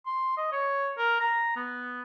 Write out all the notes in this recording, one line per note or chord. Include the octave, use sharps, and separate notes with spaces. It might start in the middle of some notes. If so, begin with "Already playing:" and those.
C6
D#5
C#5
A#4
A#5
B3